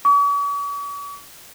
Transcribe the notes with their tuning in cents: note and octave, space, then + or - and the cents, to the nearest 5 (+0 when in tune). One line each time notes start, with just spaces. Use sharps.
C#6 +45